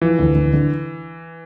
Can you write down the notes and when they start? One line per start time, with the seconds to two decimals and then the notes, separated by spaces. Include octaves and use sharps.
0.02 E3 F3
0.19 D2
0.35 D2
0.53 D3